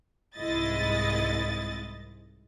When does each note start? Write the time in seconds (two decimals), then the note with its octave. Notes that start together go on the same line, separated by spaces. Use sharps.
0.37 C2 G#2 G#3 E4 D#5 A6